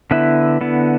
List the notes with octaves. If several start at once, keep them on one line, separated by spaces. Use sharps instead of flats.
D3 B3 E4 B4 E5
D3 B3 E4